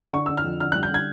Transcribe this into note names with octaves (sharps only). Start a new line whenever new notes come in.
D3 C#6
D3 E6
F6
F2
D3 F6
G3 F#6
G6
D3 G#6